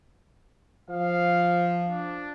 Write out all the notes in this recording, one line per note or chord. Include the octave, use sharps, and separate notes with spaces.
F3 F5
D4